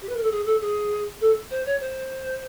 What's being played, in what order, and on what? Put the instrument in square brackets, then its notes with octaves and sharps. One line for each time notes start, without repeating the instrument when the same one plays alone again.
[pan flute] G4
B4
A#4
A4
G#4
A4
G#4
A4
C5
C#5
C5